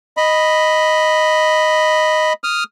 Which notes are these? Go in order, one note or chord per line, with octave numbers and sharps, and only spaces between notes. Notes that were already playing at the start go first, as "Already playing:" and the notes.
D#5 B5
D#6 F6